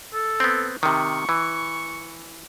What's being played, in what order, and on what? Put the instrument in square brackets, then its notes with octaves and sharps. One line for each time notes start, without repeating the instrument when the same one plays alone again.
[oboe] A4
[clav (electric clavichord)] B3 C4
[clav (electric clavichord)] C3 D#3 [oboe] C#6
[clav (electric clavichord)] E3